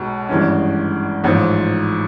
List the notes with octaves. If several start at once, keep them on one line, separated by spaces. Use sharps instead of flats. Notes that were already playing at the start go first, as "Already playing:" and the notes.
Already playing: B1 B2 G#3
G#1 G2 E3 G#3 C#4
A1 G#2 F3